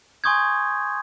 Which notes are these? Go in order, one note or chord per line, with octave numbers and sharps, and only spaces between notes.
G#5 C6 C#6 D#6 G6 G#6